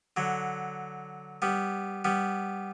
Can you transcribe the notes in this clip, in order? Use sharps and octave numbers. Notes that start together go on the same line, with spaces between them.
D3 F#3
G3 B3
G3 B3